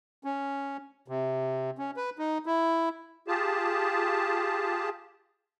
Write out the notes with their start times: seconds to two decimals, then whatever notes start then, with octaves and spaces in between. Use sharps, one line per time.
0.24 C#4
1.08 C3
1.78 C#4
1.97 B4
2.18 D#4
2.46 E4
3.28 F4 G4 G#4 A5